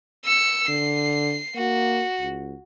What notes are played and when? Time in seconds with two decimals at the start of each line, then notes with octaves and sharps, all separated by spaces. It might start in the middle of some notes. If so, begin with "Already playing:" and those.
0.24 E6 C#7
0.69 D3 C7
1.55 A#3 F#4
2.21 C#2